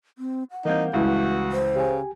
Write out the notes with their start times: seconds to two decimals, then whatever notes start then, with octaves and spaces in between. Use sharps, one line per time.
0.18 C4
0.51 F#5
0.65 E3 G3 A#3 C4 D#4 F5 G6
0.93 C#2 E3 G3 E4 F#4 F5
1.52 C5
1.76 C#3 G4 G#5